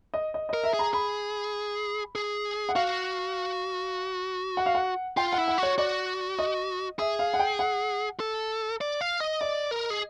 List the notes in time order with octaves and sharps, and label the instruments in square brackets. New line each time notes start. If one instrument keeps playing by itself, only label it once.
[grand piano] D#5
D#5
[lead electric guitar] A#4 [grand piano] D#5
[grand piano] E5
[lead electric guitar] G#4
[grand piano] A#5
[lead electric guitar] G#4 [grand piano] B5
[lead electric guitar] G#4
[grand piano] F#5
[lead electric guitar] F#4 [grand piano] F5
[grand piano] F#5
F5
F#5
[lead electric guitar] F4 [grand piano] G5
[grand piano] F#5
[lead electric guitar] E4
[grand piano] F#5
[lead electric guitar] F#4 [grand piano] C#5
[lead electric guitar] F#4 [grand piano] D5
[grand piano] D#5
[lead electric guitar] G#4 [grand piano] E5
[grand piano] F5
F#5
G5
F#5
[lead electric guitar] A4
D5
F5
D#5
[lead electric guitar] D5 [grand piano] D#5
[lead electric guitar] A#4
G#4